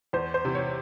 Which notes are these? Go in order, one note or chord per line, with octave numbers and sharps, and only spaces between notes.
E2 C5
C5
C3 E3
C#5